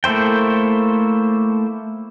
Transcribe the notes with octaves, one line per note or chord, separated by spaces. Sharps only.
A3 A#3 E4 C5 G5